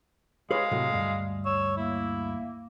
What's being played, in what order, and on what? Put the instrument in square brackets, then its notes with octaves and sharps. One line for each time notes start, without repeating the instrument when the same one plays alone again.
[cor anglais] G#3 [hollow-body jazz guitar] G#4 B4 C#5 [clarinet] F5
[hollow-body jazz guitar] A2 C3 F#3
D2 G2
[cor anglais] C#5 [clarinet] E6
[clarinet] A#3 [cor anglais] E4